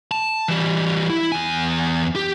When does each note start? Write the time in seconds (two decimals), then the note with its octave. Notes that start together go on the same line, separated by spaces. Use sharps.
0.11 A5
0.48 E3 G3
1.10 E4
1.32 E2 G#5
2.16 G4